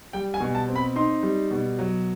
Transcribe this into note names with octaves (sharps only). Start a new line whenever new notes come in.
G3 G5
G#5
B2
A5
C4
B5
D#4 C6
G3
B2
F#3